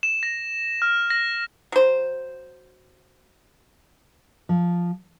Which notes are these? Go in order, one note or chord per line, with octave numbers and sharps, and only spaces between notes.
E7
A#6
F6
A#6
F#3 C5
F3